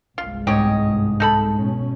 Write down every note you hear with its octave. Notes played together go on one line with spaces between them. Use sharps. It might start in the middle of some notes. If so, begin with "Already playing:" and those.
G1 C2 G#3 F4
G#2 G4 C#5 D#5
D#4 A4 B5
B2 C#4